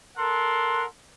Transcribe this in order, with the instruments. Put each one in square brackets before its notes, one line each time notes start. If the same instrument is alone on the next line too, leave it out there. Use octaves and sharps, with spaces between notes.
[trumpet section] A4 A#4 F#5 C6